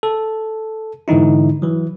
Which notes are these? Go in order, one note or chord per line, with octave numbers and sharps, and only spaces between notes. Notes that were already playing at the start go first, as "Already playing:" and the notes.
A4
G#2 D3 E3 D#4 E4
E3 F#3